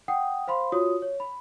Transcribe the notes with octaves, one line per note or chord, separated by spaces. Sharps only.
F#5 G5 D#6
C5 F5 B5 C6
F4 F#4 C#5 D#6
C#5
B5